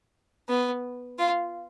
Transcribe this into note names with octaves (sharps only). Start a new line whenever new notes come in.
B3
F4